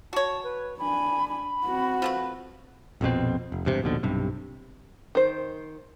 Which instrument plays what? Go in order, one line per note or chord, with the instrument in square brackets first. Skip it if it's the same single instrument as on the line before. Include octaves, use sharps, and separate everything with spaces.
[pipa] F#4 C#5 [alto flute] A5
[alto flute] B4
[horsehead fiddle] D4 G#5 [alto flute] B5
[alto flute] B5
[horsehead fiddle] C4 F#4
[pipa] F3 A3 B4
[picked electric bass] A#1 F2 B2 C4
F1
E1 G2 C3
A#1 D#2 B2 D3
B1 G2 C3
[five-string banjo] D#3 C5